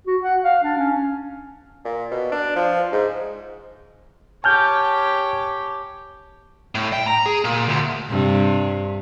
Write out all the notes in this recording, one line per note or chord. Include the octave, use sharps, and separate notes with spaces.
F#4
F#5
F5
D4
C#4
A#2
B2
D4
F3
G#2
G4 C#5 G#5 A5 F6 G6
A2
G5
A#5
G#4
A#2
D2
G2 C3